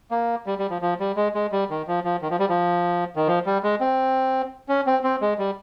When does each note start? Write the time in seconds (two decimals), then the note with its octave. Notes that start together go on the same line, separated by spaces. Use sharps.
0.11 A#3
0.46 G3
0.59 G3
0.70 F3
0.82 F3
1.00 G3
1.16 G#3
1.34 G#3
1.52 G3
1.70 D#3
1.88 F3
2.04 F3
2.22 D#3
2.30 F3
2.39 G3
2.49 F3
3.16 D#3
3.27 F3
3.46 G3
3.63 G#3
3.80 C4
4.69 C#4
4.86 C4
5.04 C4
5.21 G#3
5.38 G3